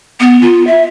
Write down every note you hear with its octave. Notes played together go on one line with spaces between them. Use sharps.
B3
F4
E5